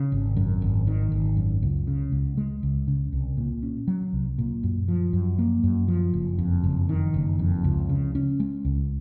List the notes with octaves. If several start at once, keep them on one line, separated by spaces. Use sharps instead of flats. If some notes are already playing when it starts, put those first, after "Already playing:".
Already playing: C#3
G#1
F#2
G#1
D#3
G#1
F#2
C#2
C#3
C#2
G#3
C#2
C#3
C2
A#2
C#4
F#3
C2
A#2
F#2
F3
F#2
A#3
F#2
F3
F#1
F2
F#1
D#3
F#1
F2
C#2
C#3
C#4
G#3
C#2